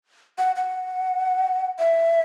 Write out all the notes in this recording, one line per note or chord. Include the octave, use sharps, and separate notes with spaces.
F#5
F#5
E5